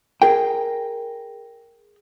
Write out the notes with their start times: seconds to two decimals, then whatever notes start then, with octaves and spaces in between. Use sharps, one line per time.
0.22 G#4 A#4 G5